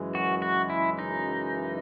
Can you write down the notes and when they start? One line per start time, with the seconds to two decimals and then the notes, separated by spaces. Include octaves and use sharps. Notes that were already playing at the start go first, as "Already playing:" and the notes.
Already playing: F#2 C#3 E3 G#3
0.15 F#4
0.42 F#4
0.70 E4
0.99 D#4